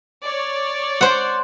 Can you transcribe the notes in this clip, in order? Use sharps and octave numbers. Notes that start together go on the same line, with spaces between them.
C#5 D5
C5 F#5